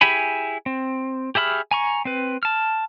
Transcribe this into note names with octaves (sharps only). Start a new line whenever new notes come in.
E4 G4 G#4 G#5 B5
C4
G4 G#4 E5 B5 F6
G#5 A#5 C#6
C4 B4
A5 F6